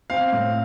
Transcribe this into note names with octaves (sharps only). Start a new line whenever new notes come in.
C4 F5
A2